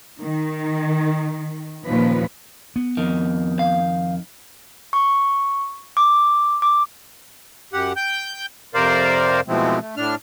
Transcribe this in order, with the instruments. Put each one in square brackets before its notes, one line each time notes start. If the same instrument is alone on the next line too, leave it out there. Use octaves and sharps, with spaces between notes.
[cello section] D#3
D#2 A#2 D#3 F3 C#4 B4
[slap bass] B3
[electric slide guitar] F2 D#3
[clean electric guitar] F5
[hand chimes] C#6
D6
D6
[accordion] F#2 G4 F#5
G5 G6
F2 C3 A#4 C5 D5 F5
B2 E3 F3 G#3 A3 C4
A3
A2 D4 F6